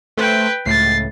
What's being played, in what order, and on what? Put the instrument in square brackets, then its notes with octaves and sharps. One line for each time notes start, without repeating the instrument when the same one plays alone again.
[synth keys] A3 C5 [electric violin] B4 G5
[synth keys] C#2 A2 [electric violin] A6 C7